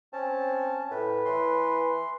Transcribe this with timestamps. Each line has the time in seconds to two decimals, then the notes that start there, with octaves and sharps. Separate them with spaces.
0.13 C4 C#4 A5
0.90 A2 B4
1.25 E3 C6